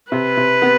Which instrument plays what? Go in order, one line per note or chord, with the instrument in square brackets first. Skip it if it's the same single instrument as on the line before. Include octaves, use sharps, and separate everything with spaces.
[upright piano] C3 [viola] B4
[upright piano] C3
B3